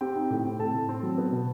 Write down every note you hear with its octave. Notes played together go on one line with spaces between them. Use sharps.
C4 G4 G5
D#4
A2
C4
A2 A4 A5
A2
C4
F#3
B3
B2